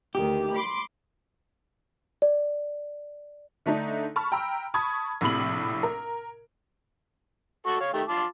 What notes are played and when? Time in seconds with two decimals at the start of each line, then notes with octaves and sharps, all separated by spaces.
0.15 D2 D#3 G4
0.54 B5 C6 D6
2.22 D5
3.66 D3 A3 D4 D#4
4.16 A5 B5 C#6 F6
4.32 G5 A#5 B5 E6
4.74 A5 B5 C#6 D#6 G#6
5.21 A#1 A2 C3 B5 F#7
5.83 A#4
7.66 F#4 A4 C#6
7.80 C#5 F5
7.93 D#3 A3 G4
8.08 F4 A5 D6